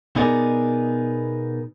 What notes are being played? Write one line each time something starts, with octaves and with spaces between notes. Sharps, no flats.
B2 B3 D#4 G#4 A#4 D5